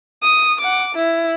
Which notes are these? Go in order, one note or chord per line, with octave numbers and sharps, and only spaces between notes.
D#6
F#5 D6
E4